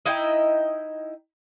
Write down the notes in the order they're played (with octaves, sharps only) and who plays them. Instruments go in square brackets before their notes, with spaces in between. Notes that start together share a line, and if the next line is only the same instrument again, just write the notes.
[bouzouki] D#4 E4 D#5 G5